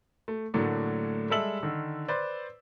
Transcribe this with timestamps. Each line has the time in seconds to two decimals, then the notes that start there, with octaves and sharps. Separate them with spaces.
0.28 A3
0.54 A2 D3 F#3 A3 A#3 D4
1.30 G3 G#3 A4 E5 E6 F#7
1.63 D3 D#3
2.08 B4 C5 D5